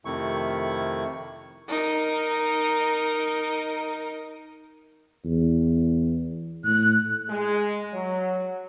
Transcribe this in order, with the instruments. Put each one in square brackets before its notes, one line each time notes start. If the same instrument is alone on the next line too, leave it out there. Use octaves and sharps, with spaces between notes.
[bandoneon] F2 C3 D#3 A3 E4 C#6
[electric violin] D#4 A#4
[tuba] E2
[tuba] A2 [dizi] F#6
[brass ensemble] G#3
F#3